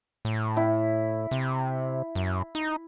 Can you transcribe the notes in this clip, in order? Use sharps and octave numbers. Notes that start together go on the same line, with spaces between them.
A2
E4
C3
F#2
D#4